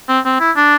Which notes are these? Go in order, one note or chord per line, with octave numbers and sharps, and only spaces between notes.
C4
C4
E4
D4